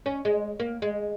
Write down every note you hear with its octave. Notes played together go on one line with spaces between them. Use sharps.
C#4
G#3
A#3
G#3